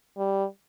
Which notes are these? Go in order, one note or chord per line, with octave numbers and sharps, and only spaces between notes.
G3